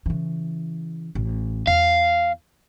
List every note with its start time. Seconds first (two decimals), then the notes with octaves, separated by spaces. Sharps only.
0.06 C#3 E3
1.15 A1
1.67 E2 F5